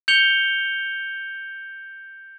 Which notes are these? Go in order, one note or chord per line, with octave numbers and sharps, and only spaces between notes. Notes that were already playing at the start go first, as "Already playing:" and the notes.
G6 C#7 F7 G7